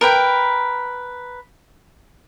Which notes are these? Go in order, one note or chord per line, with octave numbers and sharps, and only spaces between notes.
A#4 B4 G5